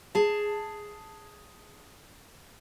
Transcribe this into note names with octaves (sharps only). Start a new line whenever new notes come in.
G#4 A5